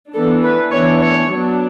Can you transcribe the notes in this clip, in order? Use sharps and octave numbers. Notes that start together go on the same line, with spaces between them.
E3 B3 D4 A4
B4
E3 B3 D4 C#5
C#5
F#3 B3 D4